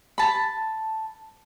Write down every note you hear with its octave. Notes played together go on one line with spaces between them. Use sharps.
A5 B5